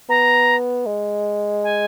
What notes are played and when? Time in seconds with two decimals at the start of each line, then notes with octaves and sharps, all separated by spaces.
0.09 B3 A#5
0.87 G#3
1.64 G#5